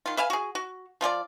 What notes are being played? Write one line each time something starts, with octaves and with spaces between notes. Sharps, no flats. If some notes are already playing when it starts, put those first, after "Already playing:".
D#3 F4
B4 E5 F5 G#5
F#4 G#4
F#4
F3 F4 G#4 D5